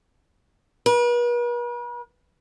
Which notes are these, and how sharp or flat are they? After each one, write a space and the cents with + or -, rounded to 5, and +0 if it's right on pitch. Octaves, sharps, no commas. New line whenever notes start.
B4 -45